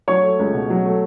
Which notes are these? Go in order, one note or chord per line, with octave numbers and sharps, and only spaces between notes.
F#3 C#5 C#6
A3
C#2
B2
F#3
A3